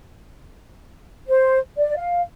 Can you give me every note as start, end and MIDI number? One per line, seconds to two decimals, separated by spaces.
1.28 1.58 72
1.77 1.94 74
1.97 2.21 77